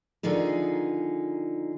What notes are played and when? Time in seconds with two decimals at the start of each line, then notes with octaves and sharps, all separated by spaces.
0.23 D3 D#3 F3 D#4 G#4